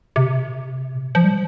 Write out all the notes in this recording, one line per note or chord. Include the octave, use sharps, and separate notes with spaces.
C3
A#2
C3
F3
G3